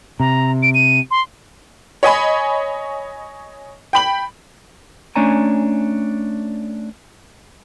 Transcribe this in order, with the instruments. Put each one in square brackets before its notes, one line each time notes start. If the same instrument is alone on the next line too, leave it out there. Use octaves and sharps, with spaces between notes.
[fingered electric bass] C3 [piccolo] A#5
[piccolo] D7
D#7
C6
[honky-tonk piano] C#5 D#5 G#5 B5
G5 B5 F#7
[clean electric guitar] A3 C#4 D4 C#5 G#5 A#5